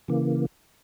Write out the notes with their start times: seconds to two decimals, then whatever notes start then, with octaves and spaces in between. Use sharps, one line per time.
0.08 C#3 E3 A#3